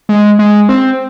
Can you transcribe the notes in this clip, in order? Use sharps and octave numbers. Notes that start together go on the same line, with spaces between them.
G#3
G#3
C4